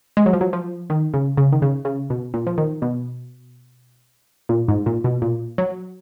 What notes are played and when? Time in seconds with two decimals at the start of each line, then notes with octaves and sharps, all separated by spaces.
0.17 G#3
0.26 F#3
0.33 F3
0.41 F#3
0.53 F3
0.90 D#3
1.14 C#3
1.37 C#3
1.52 D#3
1.62 C#3
1.85 C#3
2.10 B2
2.34 A#2
2.47 F3
2.58 D#3
2.82 B2
4.49 A#2
4.68 G#2
4.86 A#2
5.04 B2
5.22 A#2
5.58 F#3